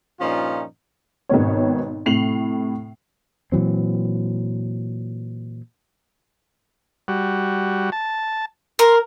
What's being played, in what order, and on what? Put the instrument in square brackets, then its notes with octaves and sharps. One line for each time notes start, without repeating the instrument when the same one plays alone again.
[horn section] G2 A#2 F3 C#4 D#4 F4
[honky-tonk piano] G#1 B2 D#3 B3 C4 C#5
A2 C3 C7 F7 F#7
[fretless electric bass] A#2 E3 F#3 C4
[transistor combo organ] G3 F#4
A5
[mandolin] A#4 [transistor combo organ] C6